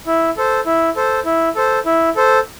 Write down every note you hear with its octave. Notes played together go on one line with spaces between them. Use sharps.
E4
A4 C5
E4
A4 C5
E4
A4 C5
E4
A4 C5